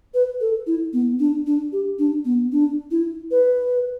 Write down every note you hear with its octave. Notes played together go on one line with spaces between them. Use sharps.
B4
A4
E4
B3
D4
D4
G4
D4
B3
D4
E4
B4